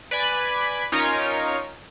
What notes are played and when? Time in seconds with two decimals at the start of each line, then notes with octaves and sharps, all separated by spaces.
0.11 B4 D5 G#5 B5
0.92 C#4 D#4 F4 A#4 C#5